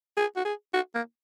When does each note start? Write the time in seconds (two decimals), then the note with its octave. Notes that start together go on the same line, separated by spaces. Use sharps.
0.17 G#4
0.36 F#4
0.45 G#4
0.74 F#4
0.95 A#3